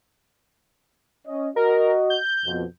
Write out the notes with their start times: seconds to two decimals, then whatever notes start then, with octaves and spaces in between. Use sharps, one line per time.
1.27 C#4 D#5
1.56 F#4 A#4 D#5
2.10 G6
2.45 F2 B2